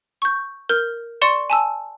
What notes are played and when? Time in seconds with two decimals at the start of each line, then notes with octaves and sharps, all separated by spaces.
0.22 C#6 G6
0.69 A#4 F6 G6
1.21 D5 C6 C#6 C#7 E7
1.50 G#5 A5 E6